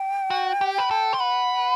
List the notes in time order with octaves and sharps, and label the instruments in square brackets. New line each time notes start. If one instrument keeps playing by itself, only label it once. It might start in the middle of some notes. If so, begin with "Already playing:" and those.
Already playing: [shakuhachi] G5
[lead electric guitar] F#4
G4
B4
A4
C5
[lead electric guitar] B4 [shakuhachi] F#5